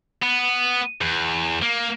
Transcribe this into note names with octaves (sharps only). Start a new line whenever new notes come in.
B3
E2
A#3